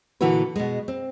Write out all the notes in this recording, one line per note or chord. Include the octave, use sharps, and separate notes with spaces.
A#2 D3 E3 E4 F#4 B4
B2 G#3
C4